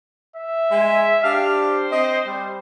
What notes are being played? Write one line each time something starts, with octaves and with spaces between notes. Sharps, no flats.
E5
G#3 G#5
D4 G4 F5
C5
C4 D#5
G3